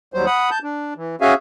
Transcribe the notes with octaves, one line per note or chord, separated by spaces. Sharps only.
D#2 F#3 G3 C5
F#5 B5 D#6
A5 G6
D4
E3
C#4 F#4 G#4 E5 F5 G#5